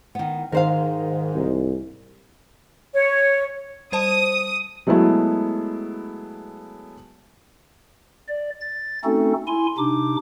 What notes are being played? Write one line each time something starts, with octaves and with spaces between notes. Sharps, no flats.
D#3 B3
G#2 D#3 A#4 C5 F5
C2
C#5
G3 C5 A5 D#6
F#3 G#3 A3 B3 E4
D5
A6
A3 C4 C#4 D#4 F#4 A4
E4 G#5 C6
C3 D4 D#4 D6